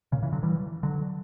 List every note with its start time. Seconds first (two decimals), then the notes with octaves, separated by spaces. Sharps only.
0.12 A#2 C#3
0.23 C#3 E3
0.32 D3 F#3
0.43 E3 G3
0.83 D3 F#3